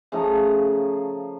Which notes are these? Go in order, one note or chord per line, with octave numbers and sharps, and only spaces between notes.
C#3 F3 A3 A#5